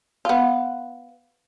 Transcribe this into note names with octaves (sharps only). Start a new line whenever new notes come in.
B3 F4